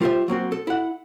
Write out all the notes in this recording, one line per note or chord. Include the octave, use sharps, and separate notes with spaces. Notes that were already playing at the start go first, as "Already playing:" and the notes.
G3 F4 G4 A#4 C5 E5
F#3 A#3 C4 F#4
A4
E4 F#5